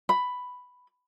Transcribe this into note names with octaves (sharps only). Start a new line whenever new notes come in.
B5